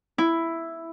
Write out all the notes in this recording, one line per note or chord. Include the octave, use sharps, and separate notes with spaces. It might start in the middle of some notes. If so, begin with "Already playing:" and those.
E4